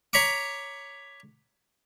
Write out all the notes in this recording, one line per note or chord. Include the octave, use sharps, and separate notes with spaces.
C#5 A#5 B5 C#6 D6